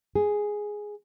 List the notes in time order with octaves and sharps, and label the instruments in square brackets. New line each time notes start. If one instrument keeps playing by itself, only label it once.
[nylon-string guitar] G#4